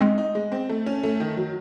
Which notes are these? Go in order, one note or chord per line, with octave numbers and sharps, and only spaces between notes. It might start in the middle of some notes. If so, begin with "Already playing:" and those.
G#3 C4 D#4
D#4
G#3
C4
A3
C#4
A3
D#3
F#3